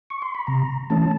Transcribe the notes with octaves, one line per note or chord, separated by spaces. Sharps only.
C#6
C6
B5
C3 A#5
E3 A3 C#4 A5